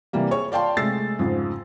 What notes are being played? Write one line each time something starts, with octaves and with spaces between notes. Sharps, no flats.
C3 E3 G3 A#3
G#4 C#5 C#6
D5 F5 G5 A5 C6
C3 G#3 A3 E6 A6 C7
F2 G#2 C#3